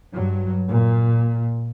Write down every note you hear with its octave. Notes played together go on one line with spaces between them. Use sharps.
G2 F#3
A#2